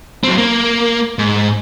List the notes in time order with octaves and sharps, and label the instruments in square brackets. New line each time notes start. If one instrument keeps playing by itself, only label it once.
[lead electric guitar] F#3 C4
A#3
G#2